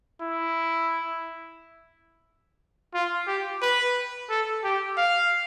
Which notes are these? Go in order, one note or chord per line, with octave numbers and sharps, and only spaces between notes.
E4
F4
G4
B4
A4
G4
F5